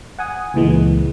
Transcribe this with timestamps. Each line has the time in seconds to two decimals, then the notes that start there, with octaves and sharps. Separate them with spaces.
0.19 F#5 G#5 D#6
0.54 C#2 A#2 E3 G#3